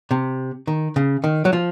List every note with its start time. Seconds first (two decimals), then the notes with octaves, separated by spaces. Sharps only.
0.11 C3
0.67 D#3
0.96 C#3
1.24 D#3
1.45 F#3
1.53 F3